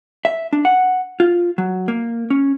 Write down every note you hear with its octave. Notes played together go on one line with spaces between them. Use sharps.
E5
D4
F#5
F4
F#3
A#3
C#4